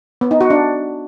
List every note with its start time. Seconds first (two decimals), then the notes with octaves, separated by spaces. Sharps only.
0.21 B3
0.31 D#4
0.41 F#4
0.50 D4